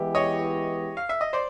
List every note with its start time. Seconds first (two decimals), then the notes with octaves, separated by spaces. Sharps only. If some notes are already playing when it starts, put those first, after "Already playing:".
Already playing: E3 G#3 B3 E4 G4
0.15 C#5 D#5
0.97 F5
1.09 E5
1.21 D#5
1.33 C5 D5